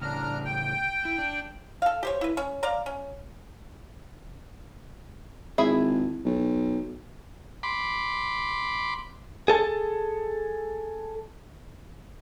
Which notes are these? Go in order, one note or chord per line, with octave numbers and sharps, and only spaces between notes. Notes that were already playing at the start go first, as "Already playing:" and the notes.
A2 C#3 D4 A#5 F6
G5
E4
D4
A4 F5
G4 C5 C#5
E4 B4
C#4
D5 F5 A#5
C#4
G#1 E4 G#4 E5
B1
B5 C6 D6
G#4 A4 A5